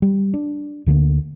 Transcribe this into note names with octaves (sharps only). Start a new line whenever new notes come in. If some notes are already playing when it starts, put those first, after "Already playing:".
G3
D4
D2 D3 D#3 A#3